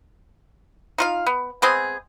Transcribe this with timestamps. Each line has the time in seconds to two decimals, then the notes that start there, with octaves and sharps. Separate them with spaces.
0.98 D#4 F4 F5
1.26 B3
1.62 G#3 B3 C4 G#4